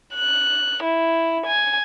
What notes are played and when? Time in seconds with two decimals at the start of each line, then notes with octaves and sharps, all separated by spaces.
0.15 F#6
0.83 E4
1.46 G#5